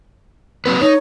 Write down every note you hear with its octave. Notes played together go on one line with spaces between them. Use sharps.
F#3 C4 B4
D#4 C#5